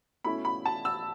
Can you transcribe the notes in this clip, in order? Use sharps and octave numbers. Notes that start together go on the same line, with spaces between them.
B2 A3 C#4 E4 B5
B5
A5
E6